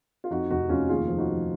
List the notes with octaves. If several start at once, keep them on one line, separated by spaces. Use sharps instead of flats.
F4
F2 D#4 F#4
F1 D#4 F#4
F1 C#4 F4
D#2 F4 G#4
F3
D#4 F#4
F3